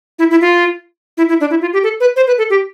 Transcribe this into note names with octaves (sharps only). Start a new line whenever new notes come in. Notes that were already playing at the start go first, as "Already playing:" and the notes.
E4
E4
F4
E4
E4
D4
E4
F4
G4
A4
B4
C5
B4
A4
G4